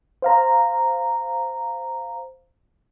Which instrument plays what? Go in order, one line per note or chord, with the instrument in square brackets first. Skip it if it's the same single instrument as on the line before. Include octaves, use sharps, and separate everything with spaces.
[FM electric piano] C5 F5 A#5